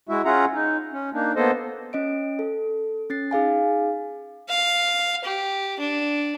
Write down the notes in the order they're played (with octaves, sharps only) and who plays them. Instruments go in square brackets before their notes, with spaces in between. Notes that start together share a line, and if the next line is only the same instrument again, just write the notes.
[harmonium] G#3 E4 F#4 E5
C#4 F4 G#4 E5 F#5 A#5
D#4
C#4
A#3 D4 D#4
A#3 B3 A4 C5 D#5
[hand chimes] C#4 D#5 D7
A4
C#4 A6 C7
D#4 G#4 F5 G#5
[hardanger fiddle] F5
G4
D4